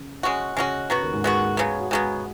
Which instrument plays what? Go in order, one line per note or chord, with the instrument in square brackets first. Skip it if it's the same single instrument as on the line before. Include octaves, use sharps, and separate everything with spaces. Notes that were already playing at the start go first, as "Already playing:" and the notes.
Already playing: [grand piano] C#3
[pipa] G#3 C#4 F#4
[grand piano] C#3 [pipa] G#3 C#4 F#4
[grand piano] C#3 [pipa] F#3 B3 F#4
[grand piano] D#2 D#3
G#2 G#3
[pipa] F#3 B3 F#4 [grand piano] G#3 G#4
[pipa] C#3 F#3 B3
[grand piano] F#4
[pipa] C#3 F#3 B3 [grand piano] G#3 G#4